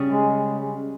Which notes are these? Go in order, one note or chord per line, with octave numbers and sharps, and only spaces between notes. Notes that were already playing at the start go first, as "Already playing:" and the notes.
Already playing: C#3 G3 C#4
G#3